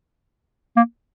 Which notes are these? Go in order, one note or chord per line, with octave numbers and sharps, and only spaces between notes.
A#3